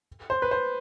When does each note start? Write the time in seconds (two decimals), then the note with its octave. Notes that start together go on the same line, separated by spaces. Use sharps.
0.30 C5
0.42 B4
0.51 C5